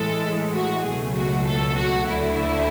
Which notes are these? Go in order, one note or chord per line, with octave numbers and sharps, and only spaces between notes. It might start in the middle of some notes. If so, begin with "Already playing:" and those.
Already playing: A2 E3 G#3 A4
F#4
C#2 B2 F#3 A3 G#4
F#4
A4
F#4
D2 D3 A3 E4